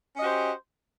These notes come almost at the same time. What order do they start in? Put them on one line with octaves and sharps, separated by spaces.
C#4 D#5 F#4 G4 C5